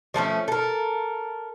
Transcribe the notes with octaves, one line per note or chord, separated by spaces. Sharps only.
F3 A3 B3 C#4
A4 A#4